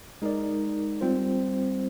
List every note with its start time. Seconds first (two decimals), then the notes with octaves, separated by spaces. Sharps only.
0.22 G#3 D#4 A#4 D5
1.01 G3 C4 F4 C5